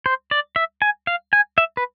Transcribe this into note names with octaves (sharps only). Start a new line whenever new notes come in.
C5
D5
E5
G#5
F5
G#5
E5
B4